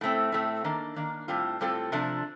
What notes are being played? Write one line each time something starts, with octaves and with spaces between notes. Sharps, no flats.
A2 A3 C4
A2 A3 C4
D#3 A#3 D4
D#3 A#3 D4
A2 G3 C4 F4 A4
A2 G3 C4 F4 A4
C3 F3 A3 D4